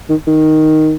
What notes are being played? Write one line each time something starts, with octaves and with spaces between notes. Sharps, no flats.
D#3
D#3